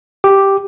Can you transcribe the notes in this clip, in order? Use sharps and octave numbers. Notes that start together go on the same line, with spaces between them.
G4